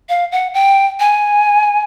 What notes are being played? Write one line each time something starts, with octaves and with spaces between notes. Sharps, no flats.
F5
F#5
G5
G#5